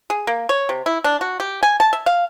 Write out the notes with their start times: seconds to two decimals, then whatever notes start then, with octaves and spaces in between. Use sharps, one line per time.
0.10 G#4
0.27 A#3
0.49 C#5
0.69 C3
0.86 E4
1.04 D4
1.21 F#4
1.40 G4
1.63 G#5
1.80 A5
1.93 E5
2.06 F5